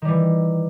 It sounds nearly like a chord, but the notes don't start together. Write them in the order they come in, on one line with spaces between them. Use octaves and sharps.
D#3 G3 E3